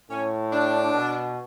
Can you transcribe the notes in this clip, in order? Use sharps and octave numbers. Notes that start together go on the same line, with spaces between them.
A2 C#4
D4
B2